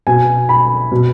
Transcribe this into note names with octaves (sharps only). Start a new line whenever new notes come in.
B2 G#5
B5
B2